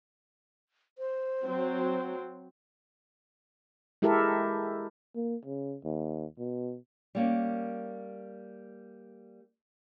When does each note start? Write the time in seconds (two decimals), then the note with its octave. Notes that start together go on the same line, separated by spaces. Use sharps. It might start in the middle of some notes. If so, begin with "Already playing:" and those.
0.98 C5
1.44 F#3 C4
4.02 G#3 E4 G4 A4 A#4 E5
5.15 A#3
5.45 C#3
5.84 D#2
6.39 B2
7.15 G3 A#3 C#4